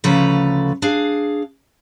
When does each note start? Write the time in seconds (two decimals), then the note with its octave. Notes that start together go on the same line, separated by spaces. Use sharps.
0.04 D2 C#3 F3 A4 B4 A#5
0.82 D4 G#4 F5